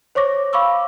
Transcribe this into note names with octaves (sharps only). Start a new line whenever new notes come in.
C5 C#5 C#6 D6 A#6
F5 B5 C#6 D6 E6